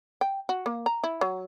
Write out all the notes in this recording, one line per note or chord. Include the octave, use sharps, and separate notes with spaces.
G5
F#4
A#3
A#5
E4
F#3